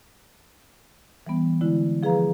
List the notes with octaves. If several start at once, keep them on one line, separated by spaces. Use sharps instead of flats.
E3 G3 B3
D3 G#3 E4
F3 G#4 B4 F5 A#5